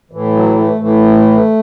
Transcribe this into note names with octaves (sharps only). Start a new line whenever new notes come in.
A2 E3
F#3
A3
A2 E3 A3